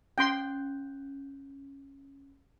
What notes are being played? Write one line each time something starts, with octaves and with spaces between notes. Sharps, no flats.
C#4 G5 C6 F#6 G6